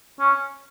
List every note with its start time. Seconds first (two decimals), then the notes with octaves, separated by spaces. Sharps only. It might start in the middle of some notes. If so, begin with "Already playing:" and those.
0.20 C#4